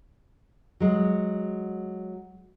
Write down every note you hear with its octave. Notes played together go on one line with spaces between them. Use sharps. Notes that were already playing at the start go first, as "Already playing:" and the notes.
F#3 G#3